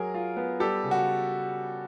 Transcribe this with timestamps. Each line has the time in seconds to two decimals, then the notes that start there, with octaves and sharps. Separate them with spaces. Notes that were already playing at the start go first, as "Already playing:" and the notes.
Already playing: F#3 G#4 A#4
0.14 F4
0.37 B3
0.60 G3 G4 A4
0.83 C#3
0.91 F#4